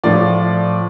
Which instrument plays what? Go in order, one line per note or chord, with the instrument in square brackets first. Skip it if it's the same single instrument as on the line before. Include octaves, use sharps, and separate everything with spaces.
[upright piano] A2 F3 D5